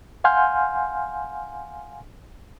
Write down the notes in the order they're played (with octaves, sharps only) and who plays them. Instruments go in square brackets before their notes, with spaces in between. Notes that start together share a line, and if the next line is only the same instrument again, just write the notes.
[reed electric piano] F5 F#5 G#5 C6 F6 G6